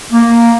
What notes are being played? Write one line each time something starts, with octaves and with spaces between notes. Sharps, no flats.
A#3